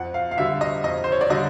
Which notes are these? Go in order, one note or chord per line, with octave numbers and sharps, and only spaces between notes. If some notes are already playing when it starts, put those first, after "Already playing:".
Already playing: F2 F#5
F5
F5
D3 G3 E5
D#5
F2 D#5
C5
C#5
D5
D3 G3 D#5